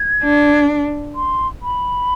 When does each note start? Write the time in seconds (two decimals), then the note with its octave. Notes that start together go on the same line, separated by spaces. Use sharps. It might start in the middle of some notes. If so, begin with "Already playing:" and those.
Already playing: G#6
0.23 D4
1.15 C6
1.62 B5